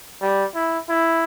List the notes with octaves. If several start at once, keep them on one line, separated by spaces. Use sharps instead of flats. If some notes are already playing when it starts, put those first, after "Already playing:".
G3
E4
E4